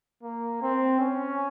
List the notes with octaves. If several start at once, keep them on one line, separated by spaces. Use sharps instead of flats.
A#3
C4
C#4